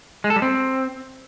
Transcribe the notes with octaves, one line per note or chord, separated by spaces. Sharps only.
G#3
A4
G3
C4